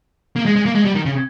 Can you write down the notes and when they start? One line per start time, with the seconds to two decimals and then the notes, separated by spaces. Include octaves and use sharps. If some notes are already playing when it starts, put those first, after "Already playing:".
0.36 A#3
0.46 G#3
0.56 G#3
0.66 A#3
0.75 G#3
0.86 G3
0.95 D#3
1.05 C#3